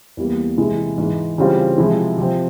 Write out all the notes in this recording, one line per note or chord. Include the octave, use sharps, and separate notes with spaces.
E2 E3 G3 A#3
C3 E3 G#3 E4
G#2 E3 G#3
C#3 E3 G3 C4 F4
C3 F3 G#3 E4
C3 F3 C4